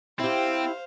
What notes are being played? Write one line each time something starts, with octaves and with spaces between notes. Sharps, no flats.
C4 E4 G4 C5 F5